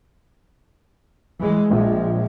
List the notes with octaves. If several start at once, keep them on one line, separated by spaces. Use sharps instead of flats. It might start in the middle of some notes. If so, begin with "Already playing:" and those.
E3 G#3
A#1 F3 G#3